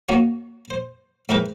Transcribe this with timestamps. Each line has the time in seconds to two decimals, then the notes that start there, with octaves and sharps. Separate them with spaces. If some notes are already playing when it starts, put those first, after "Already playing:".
0.09 A#3 C#4 D#4 F#4 C#5
0.70 C5
1.29 G#2 E4 G#4 A#4 B4 G5